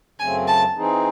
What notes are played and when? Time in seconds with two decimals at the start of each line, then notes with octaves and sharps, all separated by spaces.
0.19 F#2 C#3 F#3 A3 C4 G#5
0.48 A5
0.76 E3 C4 D#4 G#4